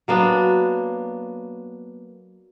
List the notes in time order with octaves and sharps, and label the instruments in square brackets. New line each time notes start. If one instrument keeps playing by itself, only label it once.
[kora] F#3 A#3 B3 D4